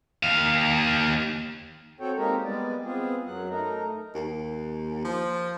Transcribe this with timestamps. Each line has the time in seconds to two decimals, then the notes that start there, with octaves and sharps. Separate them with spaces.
0.23 D#2 F5
2.00 C4 F#4 A4 C#5 G5
2.17 G#3 A#3 C4 D#4 G4 A#4
2.44 G3 G#3 B3 D5
2.84 B3 C4 F4 G#4
3.27 F#2 F#3 F#5
3.49 A3 D#4 A#4
4.15 D#2
5.05 F3